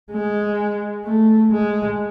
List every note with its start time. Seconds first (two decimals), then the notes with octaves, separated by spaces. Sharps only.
0.11 G#3
1.05 A3
1.52 G#3